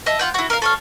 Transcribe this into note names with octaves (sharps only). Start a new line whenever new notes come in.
D#5 E5 A5
F4 F#5 G5
E4 F#4
A#4 F5
A4 C#5 F5